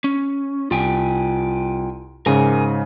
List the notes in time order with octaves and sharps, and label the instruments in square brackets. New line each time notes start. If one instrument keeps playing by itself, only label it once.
[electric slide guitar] C#4
[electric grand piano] C2 [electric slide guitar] F4 G5 G#5
[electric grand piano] G#2 C#3 [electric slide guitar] A#4 G#5